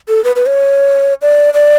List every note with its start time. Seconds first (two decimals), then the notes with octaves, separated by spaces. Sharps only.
0.09 A4
0.24 B4
0.36 B4
0.46 C#5
1.22 D5
1.54 D5